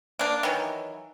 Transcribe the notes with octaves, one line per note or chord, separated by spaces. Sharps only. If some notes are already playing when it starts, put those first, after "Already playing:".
A#3 D4
D#3 E3 F#3